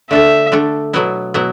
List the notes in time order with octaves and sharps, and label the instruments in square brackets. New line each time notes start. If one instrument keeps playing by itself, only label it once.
[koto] D3 A3 D4 A4 [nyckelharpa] E5
[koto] D3 A3 D4 A4
B2 F#3 B3 E4
B2 F#3 B3 E4